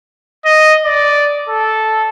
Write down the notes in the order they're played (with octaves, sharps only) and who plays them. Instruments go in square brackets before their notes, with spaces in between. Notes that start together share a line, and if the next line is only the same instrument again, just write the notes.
[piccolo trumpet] D#5
D5
A4